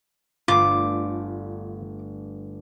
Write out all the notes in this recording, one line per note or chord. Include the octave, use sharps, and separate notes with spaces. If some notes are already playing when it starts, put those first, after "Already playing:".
G1 A3 F4 D5 D6